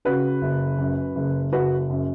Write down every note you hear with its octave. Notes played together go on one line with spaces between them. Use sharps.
C#3 F#4 B4
F#1
F#2
F#1
F#1 F#4 B4
F#2